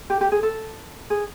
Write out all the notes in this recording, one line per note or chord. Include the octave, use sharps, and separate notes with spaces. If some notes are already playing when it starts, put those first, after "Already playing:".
G4
G4
G#4
A4
G#4